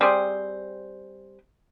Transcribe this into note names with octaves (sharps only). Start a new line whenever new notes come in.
G3 C4 G#4 C5